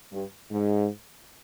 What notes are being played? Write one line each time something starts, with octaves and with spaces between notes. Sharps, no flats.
G2
G#2